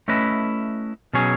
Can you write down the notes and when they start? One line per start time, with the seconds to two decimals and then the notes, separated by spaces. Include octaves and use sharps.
0.08 A3 C#4 E4 B4 D#5
1.13 B2 F#3 C#4 G#4 C#5